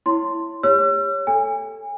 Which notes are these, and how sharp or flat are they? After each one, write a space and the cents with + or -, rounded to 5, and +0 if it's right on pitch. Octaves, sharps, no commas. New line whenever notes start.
E4 +0 C#5 +0 C6 +0
G4 +35 C#5 +0 E6 +45
A4 +0 G#5 -30